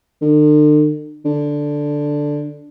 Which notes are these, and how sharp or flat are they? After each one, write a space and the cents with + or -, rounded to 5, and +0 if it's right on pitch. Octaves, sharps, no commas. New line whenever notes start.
D3 +40
D3 +0